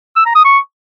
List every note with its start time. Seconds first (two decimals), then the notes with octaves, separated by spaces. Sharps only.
0.16 E6
0.26 A#5
0.35 D#6
0.45 C#6